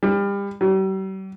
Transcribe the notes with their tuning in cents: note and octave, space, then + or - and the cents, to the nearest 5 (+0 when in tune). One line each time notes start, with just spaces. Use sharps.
G3 +30
G3 -45